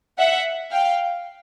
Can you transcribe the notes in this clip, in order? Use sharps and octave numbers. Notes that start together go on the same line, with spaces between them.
E5 F#5
F5 G5